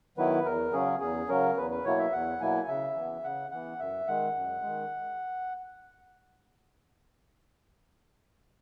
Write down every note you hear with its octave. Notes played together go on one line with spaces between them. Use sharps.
D#3 F#3 B3 E4 B4
E2 A#4
C#3 F#3 C#4 G#4
E2 G#4
C#3 F#3 C#4 A#4
E2 B4
B4
B2 F#3 A#3 E4 C#5
E5
E2 F#5
B2 F#3 A#3 E4 G#5
C#3 E5
E3 B3
C#3 F#5
E3 B3 F#5
F#2 E5
D#3 G#3 F#5
F#2
G#3
D#3